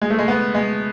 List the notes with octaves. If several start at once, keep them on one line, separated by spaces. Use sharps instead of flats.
G#3
A3
G#3
B3
G#3